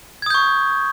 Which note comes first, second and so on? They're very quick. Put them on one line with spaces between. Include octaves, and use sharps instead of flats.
G#6 D#6 G6 C#6